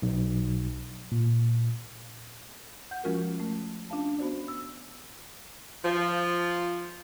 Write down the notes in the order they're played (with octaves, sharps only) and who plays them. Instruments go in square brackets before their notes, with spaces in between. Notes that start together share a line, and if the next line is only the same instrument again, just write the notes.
[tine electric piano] B1
[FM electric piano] A#2
[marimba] F#5 G6
F3 G#3 C#4 F4 F#4 A#4
A3
C#4 D4 F4 F5 A5
B3 F#4 C5 D5
E6
[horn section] F3